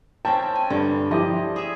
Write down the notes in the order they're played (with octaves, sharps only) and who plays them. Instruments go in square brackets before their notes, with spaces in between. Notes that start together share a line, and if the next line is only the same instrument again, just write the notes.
[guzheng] C4 C#4 E5 [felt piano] G5 A5
[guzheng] G#5
[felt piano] G2 [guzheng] D3 G3
[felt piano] F3 E4 G4 [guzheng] D#5
[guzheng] G#4 E5